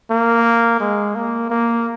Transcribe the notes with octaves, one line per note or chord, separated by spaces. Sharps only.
A#3
G#3
A#3
A#3